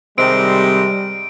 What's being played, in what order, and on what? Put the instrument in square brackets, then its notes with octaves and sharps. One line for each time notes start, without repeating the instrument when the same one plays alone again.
[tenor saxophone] C3 [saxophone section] D#3 G#3 C4 [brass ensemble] G3 [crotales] D7